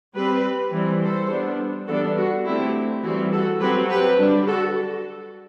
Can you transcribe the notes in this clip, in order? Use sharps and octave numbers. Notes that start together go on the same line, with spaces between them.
G3 C4 G4 B4
E3 G3 C4
A4 C5
G3 B3 D4
E3 G3 B3 D4 F#4 A4
F#4
D3 A3 C4 E4 G4
E3 G3 C4 F#4
F#4 A4
F#3 C4 G4 B4
G4 B4
D3 G3 D4
F#4 A4